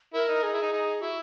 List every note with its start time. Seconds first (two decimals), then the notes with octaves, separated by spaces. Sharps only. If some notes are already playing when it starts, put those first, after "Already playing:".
0.13 E4 A#4
0.28 D#4
0.43 D#4 G#4
0.53 E4
0.62 D#4
0.73 D#4
1.01 E4 F#4